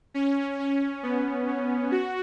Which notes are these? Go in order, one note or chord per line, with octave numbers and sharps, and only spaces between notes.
C#4
C#4
B3
C#4
F#4